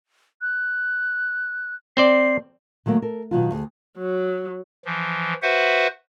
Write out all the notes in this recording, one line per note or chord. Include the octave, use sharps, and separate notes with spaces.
F#6
C4 C5 D5 C7
D#3 F#3 A3 A#3
A4 A#4
B2 D#3 F#3 F4
D2 G#4
F#3
E3 F3
F#4 B4 C5 E5 F#5